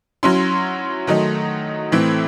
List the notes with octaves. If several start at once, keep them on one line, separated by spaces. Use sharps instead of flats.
F#3 C#4 E4 C6
D#3 F#3 A3 D#4
A2 E3 A3 C4 E4